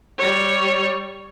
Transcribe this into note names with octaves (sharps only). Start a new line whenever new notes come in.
G3 C#5